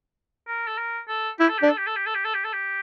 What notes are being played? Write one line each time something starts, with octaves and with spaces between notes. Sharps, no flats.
A#4
A4
A#4
A4
E4 G4
A4
D4 G4
A4
G4
A4
G4
A4
G4
A4
G4
A4
G4